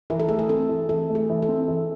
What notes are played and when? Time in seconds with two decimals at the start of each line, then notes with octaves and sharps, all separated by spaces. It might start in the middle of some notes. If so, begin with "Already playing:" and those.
0.10 E3 A#4
0.20 A4
0.29 A3 G#4
0.39 A4
0.49 C4 A4
0.69 E3
0.89 E3 A4
1.10 A3
1.15 G#4
1.30 E3
1.42 A4
1.48 C4
1.68 E3